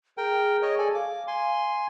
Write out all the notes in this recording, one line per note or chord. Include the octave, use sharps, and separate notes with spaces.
G#4 A#4 G5
C#5 D#5
A4 D5 G#5
F5 D6
G#5 C6